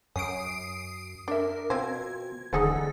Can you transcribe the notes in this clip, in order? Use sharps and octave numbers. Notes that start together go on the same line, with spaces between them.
F#2 C#4 D#6 C7 D7
D4 A#4 E5
B2 F3 C4 C5 G#6
D#1 D3 E3 D#4 G#4 A4 C5